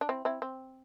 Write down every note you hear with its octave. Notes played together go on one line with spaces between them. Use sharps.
D4
C4 E4
C4 E4
C4